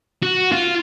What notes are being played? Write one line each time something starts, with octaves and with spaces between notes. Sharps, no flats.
F#4
F4